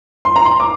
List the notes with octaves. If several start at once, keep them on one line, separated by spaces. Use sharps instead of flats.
C6
A#5
C6
D6